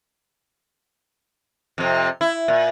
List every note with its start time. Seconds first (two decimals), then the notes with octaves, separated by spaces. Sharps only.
1.78 F2 C3
2.21 E4
2.48 A#2